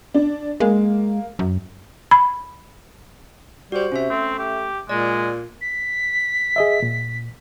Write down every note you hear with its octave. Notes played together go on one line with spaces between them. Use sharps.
D4
G#3 A#3
F#2
B5
G3 F#4 C5
C3 C#4 E5
A3 C4
G4
A#2 G#3 D5
B6
G#4 D#5 E5
A#2